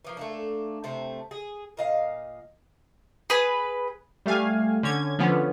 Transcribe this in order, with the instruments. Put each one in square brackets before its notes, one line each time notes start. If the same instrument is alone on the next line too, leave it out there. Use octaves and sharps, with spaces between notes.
[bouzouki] E3 F3 A#3
A3 A#3 D4
C3 A3 C5
G#4
A#2 D#5 F5
[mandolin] G#4 B4
[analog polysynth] G3 A3 F5 G#5
D3 C#4 G#6
D3 F3 B3 C#4